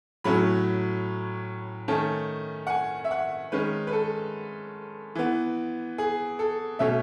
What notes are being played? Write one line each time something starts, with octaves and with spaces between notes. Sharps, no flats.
A2 F#3 A3 C#4 B5
D#3 A3 C#4 A5
F#5
G#5
E5
F#5
D#3 G#3 C#4 B4
B4
A4
E3 B3
G#4
A4
B2 A3 C#4 E5